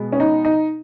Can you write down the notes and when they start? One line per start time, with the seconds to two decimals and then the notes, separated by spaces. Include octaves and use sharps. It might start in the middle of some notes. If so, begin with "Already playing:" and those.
Already playing: B2 G#3 B3
0.12 C#4
0.20 D#4
0.45 D#4